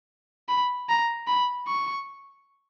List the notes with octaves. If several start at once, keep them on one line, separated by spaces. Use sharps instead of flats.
B5
A#5
B5
C#6